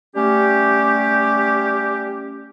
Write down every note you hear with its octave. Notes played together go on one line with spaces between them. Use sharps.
G3 A3 C#4 G4